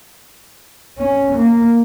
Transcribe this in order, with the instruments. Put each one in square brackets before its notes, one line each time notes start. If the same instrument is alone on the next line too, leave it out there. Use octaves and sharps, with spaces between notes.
[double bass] C#4
A#3